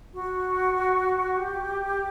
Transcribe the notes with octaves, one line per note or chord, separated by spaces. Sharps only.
F#4
G4